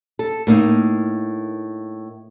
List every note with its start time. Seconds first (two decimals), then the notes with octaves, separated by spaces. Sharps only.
0.19 A4
0.47 A2 A#3 D#4